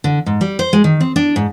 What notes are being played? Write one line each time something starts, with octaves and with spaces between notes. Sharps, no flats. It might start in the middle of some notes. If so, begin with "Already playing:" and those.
D3
G#2
G3
C5
G#3
D#3
C4
D4
G#2